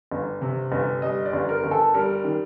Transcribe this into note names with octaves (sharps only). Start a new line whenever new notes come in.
G1
C3
G1
G3 D#5
D5
G1
A#4
G1
A4
G3 A#4
D#3